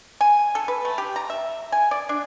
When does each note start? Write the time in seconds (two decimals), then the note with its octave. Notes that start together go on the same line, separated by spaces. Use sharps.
0.21 G#5
0.55 A4
0.68 B4
0.85 A3
0.98 G4
1.16 A#5
1.30 E5
1.72 G#5
1.91 D5
2.09 D4